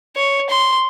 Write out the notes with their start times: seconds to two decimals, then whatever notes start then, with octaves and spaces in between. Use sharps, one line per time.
0.17 C#5
0.50 C6